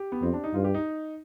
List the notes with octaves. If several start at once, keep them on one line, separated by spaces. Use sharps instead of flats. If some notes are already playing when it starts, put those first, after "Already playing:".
Already playing: G4
B3
F2 C4
D4
D#4
G2 F4
G4
D#4